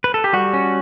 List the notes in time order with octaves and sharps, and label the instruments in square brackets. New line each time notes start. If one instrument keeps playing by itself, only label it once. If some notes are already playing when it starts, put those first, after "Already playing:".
[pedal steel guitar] B4
A4
G4
G3 F#4
C#4